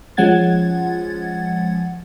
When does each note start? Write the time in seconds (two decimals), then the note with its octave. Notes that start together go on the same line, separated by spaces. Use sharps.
0.17 F3 G#3 C#4 F#5 G#6 A6